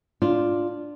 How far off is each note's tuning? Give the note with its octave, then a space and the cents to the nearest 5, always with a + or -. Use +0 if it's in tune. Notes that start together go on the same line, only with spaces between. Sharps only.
D4 +0 F4 +0